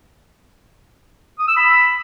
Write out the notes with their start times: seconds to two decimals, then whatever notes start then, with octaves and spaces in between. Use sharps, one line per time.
1.39 D#6
1.48 E6
1.56 B5